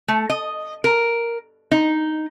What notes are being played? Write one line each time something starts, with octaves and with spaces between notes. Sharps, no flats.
A3
D#5
A#4
D#4